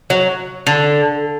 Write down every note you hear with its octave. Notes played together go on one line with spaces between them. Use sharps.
F#3
D3